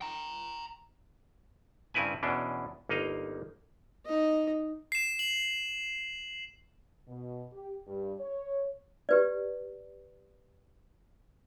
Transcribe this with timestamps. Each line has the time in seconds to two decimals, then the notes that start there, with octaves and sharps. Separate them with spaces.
0.01 G5 A#5
1.94 G2 C#3 C4 E4 B4 G#5
2.23 E2 B2 E3 C#4 D4
2.89 G1 A#3 D#4 D#5 F5
4.06 D#4 D#5
4.92 C7 E7
5.19 F#7
7.07 B2
7.52 G4
7.86 G2
8.19 C#5
9.09 G4 B4 D5